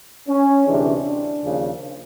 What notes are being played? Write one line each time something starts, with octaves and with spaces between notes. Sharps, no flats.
C#4
D2 C3 E3 G#3 D4
D4
D#2 C#3 F3